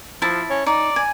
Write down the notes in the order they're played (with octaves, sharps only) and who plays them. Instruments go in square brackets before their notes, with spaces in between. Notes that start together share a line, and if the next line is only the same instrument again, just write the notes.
[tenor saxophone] F3 [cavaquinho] E4 A5
[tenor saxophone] C#4
[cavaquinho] D#4 [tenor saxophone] D5
[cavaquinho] G#5